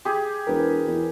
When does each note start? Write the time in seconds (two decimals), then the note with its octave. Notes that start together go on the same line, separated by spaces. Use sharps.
0.05 G4 G#4
0.47 E1 A#4 B4
0.87 E2